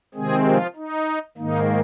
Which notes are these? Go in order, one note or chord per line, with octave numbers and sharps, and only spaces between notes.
C3 D#3 G#3 C4 G#4
F3 F4
D#4
G#2 D#3 A#3 D#4